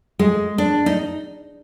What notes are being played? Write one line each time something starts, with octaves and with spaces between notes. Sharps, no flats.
G#3
D4
D#4